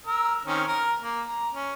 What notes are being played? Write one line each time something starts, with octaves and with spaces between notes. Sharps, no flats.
A#4 E6
D#3 C4 C#4
A#4
A#3
A#5
C#4